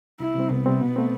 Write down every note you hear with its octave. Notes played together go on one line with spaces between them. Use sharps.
C2 E4
C3 G3 C4
C2 B3
C3 G3 C4
B2
A3 C4